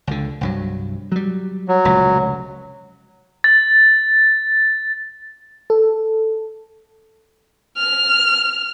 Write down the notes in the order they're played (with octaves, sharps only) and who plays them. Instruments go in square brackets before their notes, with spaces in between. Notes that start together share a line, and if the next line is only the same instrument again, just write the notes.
[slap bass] C#2 D3
C2 G2 F#3
F#3 G3
[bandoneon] F#3
[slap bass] F1 C#2 A#2
[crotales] A6
[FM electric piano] A4
[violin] F6